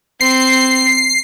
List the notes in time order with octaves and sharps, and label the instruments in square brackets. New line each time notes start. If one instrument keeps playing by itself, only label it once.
[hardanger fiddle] C4 [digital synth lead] C7